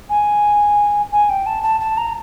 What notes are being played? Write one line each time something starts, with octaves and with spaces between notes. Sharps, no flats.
G#5
G#5
G5
A5
A5
A5
A#5